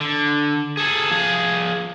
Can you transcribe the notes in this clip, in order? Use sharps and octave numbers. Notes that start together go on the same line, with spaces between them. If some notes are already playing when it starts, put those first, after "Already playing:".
D3
G#4 A4
F3 G#4